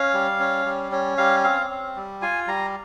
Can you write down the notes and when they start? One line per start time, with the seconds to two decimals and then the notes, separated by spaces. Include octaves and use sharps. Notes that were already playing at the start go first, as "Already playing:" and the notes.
Already playing: C#4 F5
0.14 G3
0.40 C#4
0.66 G3
0.92 C#4
1.18 G3 F5
1.44 C4 F5
1.70 C4
1.96 G3
2.22 F4 G#5
2.47 G3 A#5